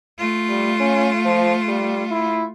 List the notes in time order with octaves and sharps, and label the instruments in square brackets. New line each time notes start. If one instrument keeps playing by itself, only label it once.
[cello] A3 F4
[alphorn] G3
C#4
F3
G3
E4